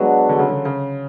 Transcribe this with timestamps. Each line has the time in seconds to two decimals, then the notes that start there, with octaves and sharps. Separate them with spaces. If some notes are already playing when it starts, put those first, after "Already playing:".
Already playing: F#3 G#3 B3 D4 F#4
0.29 D3
0.39 C#3
0.49 D3
0.65 C#3